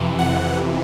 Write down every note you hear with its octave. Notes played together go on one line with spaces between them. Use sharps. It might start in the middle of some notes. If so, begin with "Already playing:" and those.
Already playing: F2 C3 E3
F#5